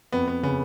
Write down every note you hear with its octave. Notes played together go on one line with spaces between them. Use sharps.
F2 B3
B3
C#3 B3